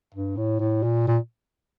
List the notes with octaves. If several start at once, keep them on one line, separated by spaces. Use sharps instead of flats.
G2
A2
A2
A#2
A#2